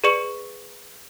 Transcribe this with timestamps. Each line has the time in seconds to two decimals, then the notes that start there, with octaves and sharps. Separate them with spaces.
0.04 G#4 B4 D5 C#6 C#7 E7